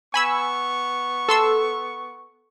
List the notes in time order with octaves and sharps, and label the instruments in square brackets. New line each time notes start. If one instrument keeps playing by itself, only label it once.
[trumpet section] B3 C#6 [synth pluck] G#5 B5 E6
[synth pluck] A4 C6 E6